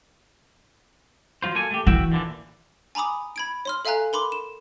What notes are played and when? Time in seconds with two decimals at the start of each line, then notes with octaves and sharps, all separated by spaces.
1.42 F#3 F4 C5
1.55 A#3 A4 G#5
1.71 A3 G4
1.87 E3 F#4 E5 G5
2.12 A#2 D3 E3
2.95 G#5 A#5 B5 D6 D#6
3.36 B5 G#6 D7
3.65 C#5 C6 F6
3.85 A4 E5 F5 G#5 A#5 F#6
4.13 A#4 B5 C6 D6
4.32 E7